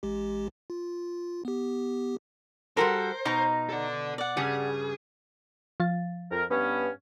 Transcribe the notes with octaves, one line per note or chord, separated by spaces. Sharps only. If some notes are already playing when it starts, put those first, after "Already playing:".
A1 G#3 G4
F4
B3 G4
G3 F#4 A4 A#4 C5 C6
B2 D#4 A#5
A4 D5
D5 F#5
G2 C#3 G3 G#4
F3 F5 A6
F2 A#4
G2 B3 C#4